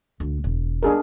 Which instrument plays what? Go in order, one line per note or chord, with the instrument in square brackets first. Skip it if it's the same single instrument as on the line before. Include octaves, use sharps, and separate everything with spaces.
[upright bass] D2
E1
[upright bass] G3 B3 [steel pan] D4 G#4 A#4